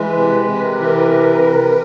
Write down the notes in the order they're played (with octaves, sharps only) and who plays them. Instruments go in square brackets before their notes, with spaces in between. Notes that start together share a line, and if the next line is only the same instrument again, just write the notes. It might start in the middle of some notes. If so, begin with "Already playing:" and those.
Already playing: [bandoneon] E3 G#3 [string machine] B4
[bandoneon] C3 [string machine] B4
[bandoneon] C3 [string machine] A#4
[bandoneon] E3
C3
C3